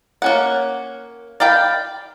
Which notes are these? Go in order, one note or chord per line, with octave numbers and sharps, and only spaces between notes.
A#3 C#4 F#5
D5 F5 G5 B5